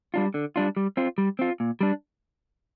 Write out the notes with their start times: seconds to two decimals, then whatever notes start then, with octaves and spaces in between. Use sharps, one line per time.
0.14 G3 D4 F4
0.34 D3
0.56 G3 D4 F4
0.77 G3
0.97 C4 F4
1.18 G3
1.39 C4 F4
1.60 A#2
1.81 G3 D4